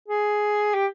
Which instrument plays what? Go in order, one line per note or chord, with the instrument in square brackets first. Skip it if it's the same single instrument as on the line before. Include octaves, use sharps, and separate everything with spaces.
[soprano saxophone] G#4
G4